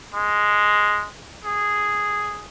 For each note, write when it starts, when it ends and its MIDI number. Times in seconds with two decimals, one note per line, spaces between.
0.14 1.08 56
1.45 2.48 68